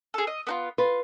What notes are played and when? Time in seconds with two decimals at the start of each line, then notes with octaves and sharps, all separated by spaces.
0.14 G#4 A4
0.27 D#5
0.47 B3 D#4 F4
0.78 F4 B4